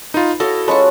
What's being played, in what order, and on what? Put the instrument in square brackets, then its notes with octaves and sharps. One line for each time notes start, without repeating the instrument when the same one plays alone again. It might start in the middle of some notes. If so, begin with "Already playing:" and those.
[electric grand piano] D#4 F4 [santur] B4
[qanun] E4 D#5 F5 [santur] F#4 [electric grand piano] A4
[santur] G#3 B4 A5 [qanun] C#4 F4 F#4